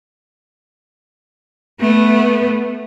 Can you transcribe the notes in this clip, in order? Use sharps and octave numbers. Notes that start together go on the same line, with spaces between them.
A3 B3